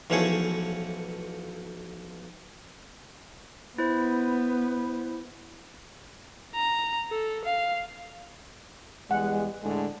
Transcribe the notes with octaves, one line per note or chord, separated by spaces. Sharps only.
B1 E3 F3 A3 G#4 C#5
B3 E4 C5
A#5
A4
F5
E2 G3 G#3 F#5
A2 D3 G#3